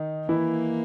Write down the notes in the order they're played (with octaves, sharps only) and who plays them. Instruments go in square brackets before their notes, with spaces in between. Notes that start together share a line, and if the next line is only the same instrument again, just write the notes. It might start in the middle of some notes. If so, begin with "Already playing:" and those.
Already playing: [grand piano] D#3 D#4
[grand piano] E3 E4 [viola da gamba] A#3